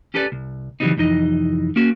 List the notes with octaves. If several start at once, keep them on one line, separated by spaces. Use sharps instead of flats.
C#4 G4 A4 B4 C5 D5
C2
C#3 E3 F#3 G3 C4 D#4
C2 F2 E3 D#4 D#5
A#3 C#4 F#4